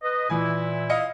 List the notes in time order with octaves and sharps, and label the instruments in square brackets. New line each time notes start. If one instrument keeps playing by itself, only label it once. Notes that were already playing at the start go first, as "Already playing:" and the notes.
[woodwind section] B4 D#5
[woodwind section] A#2 E4 [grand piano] E3 G#5
[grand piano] D#5 F5 C#7